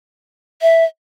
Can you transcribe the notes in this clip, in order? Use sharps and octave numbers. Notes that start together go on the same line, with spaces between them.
E5